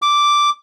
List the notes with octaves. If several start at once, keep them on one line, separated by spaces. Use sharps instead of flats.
D6